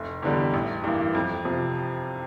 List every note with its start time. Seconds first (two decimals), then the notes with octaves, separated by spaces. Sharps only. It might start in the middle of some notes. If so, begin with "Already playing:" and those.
Already playing: F1
0.23 E2 D3 G3
0.54 A1
0.84 G2 E3 A#3
1.15 F2
1.45 C3 F3